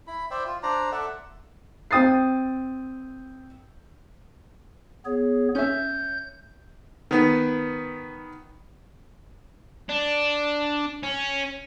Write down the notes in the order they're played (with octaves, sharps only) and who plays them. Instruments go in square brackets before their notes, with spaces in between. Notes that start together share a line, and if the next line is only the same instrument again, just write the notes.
[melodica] E4 B5
C5 D5 E5 G5
F4
D4 C5 D5 A#5
A4 D5 E5 F#5
[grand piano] C4 G5 D#6 A6 C7
[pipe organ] B3 G#4 C#5
[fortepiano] C#4 E5 [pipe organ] G6
[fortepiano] D#3 B3
[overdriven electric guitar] D4
C#4